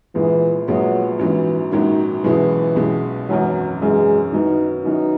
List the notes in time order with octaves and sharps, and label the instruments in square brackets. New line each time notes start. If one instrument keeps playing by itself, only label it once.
[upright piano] A#1 A#2 G#3 B3 [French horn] E3
[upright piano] A#1 A#2 G#3 B3 [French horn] F#3
[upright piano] A#1 G#2 F#3 C#4 [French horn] E3
[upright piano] A#1 G#2 F#3 C#4 [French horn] D#3
[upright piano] B1 B2 G#3 C#4 E4 [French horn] E3
[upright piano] B1 B2 G#3 C#4 E4
[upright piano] G#1 F#2 E3 [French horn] F#3
[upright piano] G#1 F#2 E3 [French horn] G#3
[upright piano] F#2 D#3 F#3 B3 E4 [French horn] D#4
[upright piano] F#2 D#3 F#3 B3 E4 [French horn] D#4